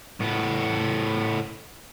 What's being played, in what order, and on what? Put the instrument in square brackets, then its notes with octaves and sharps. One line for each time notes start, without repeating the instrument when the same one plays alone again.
[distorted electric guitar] A2 B3